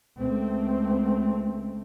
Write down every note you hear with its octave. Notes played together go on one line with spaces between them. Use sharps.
C#2 A3 C4